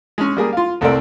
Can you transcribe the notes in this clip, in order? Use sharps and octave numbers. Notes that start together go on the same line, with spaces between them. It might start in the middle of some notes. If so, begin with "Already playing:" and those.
G#3 C#4
G3 A#3 G#4
F4 F5
C2 A3 C4 A#4 D5